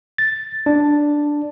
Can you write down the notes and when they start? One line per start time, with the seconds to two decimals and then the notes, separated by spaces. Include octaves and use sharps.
0.18 A6
0.66 D4